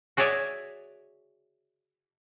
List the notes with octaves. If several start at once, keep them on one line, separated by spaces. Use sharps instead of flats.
F#4 G#4 C#5 D5 E5 G#5